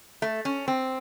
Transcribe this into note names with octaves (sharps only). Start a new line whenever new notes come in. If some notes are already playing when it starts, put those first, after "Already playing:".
A3
C#4
C4